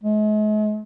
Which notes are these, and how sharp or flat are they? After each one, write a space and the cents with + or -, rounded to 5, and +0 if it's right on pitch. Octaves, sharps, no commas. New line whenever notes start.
G#3 +40